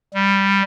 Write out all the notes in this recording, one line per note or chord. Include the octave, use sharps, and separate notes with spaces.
G3